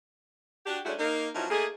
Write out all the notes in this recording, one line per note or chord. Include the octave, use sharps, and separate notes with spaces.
D4 F#4 G4
G#3 A3 C#4 D4 E4 F#4
A#3 D#4
F3 F#3 B3 C#4 D#4 E4
A3 A#3 D#4 G#4